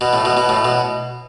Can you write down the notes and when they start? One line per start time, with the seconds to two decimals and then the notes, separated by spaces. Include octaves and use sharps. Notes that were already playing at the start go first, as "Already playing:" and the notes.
0.01 B2
0.13 A2
0.25 B2
0.37 B2
0.49 A2
0.65 B2